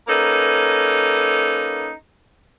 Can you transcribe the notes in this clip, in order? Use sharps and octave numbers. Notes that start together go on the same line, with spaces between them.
A#3 C#4 D#4 A4 B4